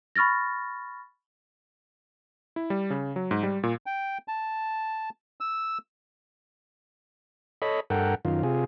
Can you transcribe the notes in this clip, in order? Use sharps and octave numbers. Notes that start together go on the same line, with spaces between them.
B5 C#6 F6 A6 A#6
E4
G3
C#3
F#3
G#2
G3
A#2
G5
A5
E6
A4 C#5 D#5 B5
G2 A4 A#4 F#5 G5
F#2 D#3 F4
C3 F4 G#4